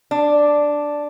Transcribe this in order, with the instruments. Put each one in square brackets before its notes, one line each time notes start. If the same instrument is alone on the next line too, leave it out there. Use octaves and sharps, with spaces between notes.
[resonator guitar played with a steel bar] D4